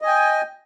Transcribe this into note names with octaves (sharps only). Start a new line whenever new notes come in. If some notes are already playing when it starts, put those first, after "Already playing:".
D#5 G5 G#5